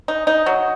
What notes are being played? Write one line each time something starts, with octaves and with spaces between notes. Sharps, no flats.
D#4
D#4
F#3